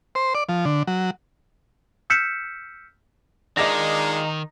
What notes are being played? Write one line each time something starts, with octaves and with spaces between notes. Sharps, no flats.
C5
D5
F3
D3
F#3
E6 F6 G6 B6 C#7 E7
D#3 G#3 D4 D#4 F4 D#5 D6 A#6